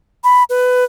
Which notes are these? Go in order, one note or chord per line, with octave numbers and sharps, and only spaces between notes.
B5
B4